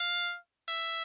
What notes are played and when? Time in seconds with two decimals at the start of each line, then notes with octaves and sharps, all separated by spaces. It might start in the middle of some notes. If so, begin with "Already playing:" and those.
Already playing: F5
0.68 E5